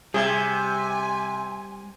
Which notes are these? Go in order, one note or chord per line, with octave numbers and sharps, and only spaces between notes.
C3 G3 G4 G#4 G#5